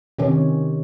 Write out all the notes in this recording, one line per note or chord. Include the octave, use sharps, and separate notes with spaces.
C3 D#3 C#4